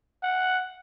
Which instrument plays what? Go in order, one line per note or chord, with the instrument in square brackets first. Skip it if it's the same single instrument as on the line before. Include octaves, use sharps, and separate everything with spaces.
[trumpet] F#5